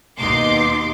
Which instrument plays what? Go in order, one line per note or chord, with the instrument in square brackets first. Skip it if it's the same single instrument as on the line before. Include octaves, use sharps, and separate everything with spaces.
[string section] D#2 B2 D#4 C6 D6